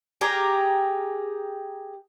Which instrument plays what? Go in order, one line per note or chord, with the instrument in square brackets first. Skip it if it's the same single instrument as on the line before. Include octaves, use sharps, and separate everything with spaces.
[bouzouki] G4 G#4 A#4